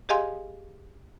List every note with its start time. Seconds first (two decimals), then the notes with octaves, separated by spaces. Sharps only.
0.09 G4 G#4 D#5 F5 G#5 C6